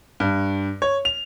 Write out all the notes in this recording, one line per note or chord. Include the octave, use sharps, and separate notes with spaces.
G2
C#5
F7